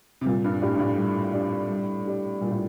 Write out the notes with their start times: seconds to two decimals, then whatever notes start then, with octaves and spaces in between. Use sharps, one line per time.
0.21 C3
0.26 A#2 G3
0.44 G2
0.62 A2 D4 G4 D5
0.75 G2
0.79 A2
0.98 G3
1.34 D4 G4 D5
1.70 G3
2.06 D4 G4 D5
2.41 A#2 G3
2.51 A2